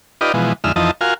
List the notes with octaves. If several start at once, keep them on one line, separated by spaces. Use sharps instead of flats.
D#4 F4 G4 B4 D5 D#5
B2 E3 F3 G#3
F2 D3 G#3 D#4 E5 F6
F2 E3 F3 D#4 D#5 A5
F4 F#4 A#4 F5 G#5